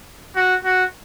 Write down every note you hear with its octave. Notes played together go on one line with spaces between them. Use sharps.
F#4
F#4